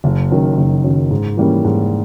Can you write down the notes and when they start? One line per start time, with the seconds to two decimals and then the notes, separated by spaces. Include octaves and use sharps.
0.04 F#1
0.31 F#2 D#3
0.58 F#1
0.84 F#2 D#3
1.11 G#2
1.37 E3 G3 A#3 C#4
1.65 G#2